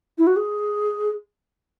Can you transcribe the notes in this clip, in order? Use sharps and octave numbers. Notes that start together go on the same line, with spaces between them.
E4
F#4
G#4